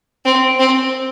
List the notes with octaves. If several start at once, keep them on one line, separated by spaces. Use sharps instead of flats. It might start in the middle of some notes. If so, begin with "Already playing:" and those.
C4
C4